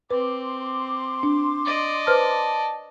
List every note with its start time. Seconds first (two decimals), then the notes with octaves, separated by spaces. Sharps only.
0.11 C4 B4 C6 D6
1.23 D4
1.65 D5 D#5
2.07 B4 C5 A5 F6